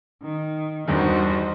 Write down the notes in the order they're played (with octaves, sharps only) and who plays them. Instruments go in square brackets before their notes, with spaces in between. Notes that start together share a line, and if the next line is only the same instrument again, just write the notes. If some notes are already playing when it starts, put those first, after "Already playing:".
[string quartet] D#3
[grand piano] E2 G2 D#3 [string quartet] D#4 F#4 C5